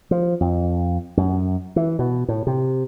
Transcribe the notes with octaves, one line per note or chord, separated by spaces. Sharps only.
F3
F2
F#2
E3
B2
A2
C3